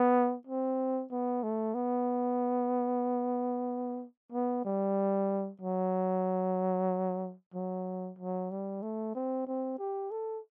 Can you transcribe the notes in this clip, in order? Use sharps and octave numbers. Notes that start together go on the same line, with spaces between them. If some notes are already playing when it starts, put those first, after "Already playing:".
Already playing: B3
C4
B3
A3
B3
B3
G3
F#3
F#3
F#3
G3
A3
C4
C4
G4
A4